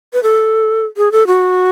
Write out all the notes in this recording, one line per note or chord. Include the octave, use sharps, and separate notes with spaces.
B4
A4
G#4
A4
F#4